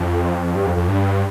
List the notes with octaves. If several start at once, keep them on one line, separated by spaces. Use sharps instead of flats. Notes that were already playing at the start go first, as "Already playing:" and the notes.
Already playing: F2
G2
F2
F2
G2